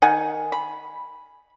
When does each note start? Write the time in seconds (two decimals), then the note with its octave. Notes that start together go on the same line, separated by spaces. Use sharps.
0.02 D#3 F#5 G#5
0.52 B5